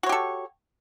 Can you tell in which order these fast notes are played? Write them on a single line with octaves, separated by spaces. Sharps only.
F#4 C#5 G4 A4